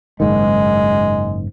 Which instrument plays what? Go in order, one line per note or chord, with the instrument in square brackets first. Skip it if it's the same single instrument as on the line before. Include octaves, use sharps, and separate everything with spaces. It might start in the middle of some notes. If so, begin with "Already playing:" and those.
[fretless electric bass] F#1 G#2 D#3 [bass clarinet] G#3